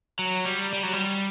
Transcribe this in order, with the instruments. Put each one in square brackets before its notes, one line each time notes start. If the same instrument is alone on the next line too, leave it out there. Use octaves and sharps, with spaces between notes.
[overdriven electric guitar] F#3
G3
G3
F#3
G3